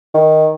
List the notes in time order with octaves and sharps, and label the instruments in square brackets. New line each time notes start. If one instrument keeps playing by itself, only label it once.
[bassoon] D#3